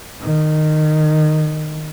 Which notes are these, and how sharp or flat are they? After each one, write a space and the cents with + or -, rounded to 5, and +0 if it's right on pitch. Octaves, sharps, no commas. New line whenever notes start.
D#3 -15